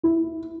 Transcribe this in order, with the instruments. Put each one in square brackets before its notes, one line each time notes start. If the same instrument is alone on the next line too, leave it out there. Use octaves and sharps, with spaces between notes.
[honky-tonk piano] E4